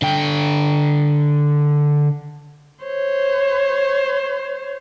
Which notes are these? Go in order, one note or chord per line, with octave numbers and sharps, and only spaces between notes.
D3 G5
C5 C#5